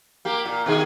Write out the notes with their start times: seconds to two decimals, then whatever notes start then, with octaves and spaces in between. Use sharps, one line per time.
0.25 A#3 G4
0.45 A#2
0.66 B2 D#3 G#4